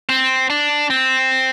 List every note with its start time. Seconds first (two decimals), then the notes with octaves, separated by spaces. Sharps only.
0.09 C4
0.50 D4
0.90 C4